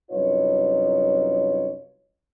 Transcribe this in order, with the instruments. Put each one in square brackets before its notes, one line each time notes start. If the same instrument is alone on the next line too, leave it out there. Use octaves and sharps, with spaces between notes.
[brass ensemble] C2 F#2 D#4 F4 B4 C#5